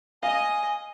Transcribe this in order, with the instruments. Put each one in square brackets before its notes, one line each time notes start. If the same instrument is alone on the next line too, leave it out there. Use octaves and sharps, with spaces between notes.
[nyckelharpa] D#5 [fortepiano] F5 [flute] G#5